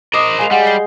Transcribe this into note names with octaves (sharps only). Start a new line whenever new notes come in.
A#4 C5 D#5 D6 D#6
G#3 F5 G#5 C7 F7
G3 F#5
G6 C7 G7